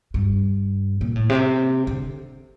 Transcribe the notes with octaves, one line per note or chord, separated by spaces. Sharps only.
G2
A#2
A2
C3
D3